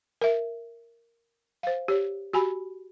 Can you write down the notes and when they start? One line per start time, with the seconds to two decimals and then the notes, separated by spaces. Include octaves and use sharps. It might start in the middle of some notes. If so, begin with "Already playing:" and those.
0.21 A#4 E5
1.63 C5 F5
1.88 G4 C#5
2.33 F#4 G4 G#5 B5